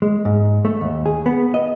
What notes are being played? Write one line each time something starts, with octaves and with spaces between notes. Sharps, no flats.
G#3
G#2
A3
D#2
G#4
B3
D#5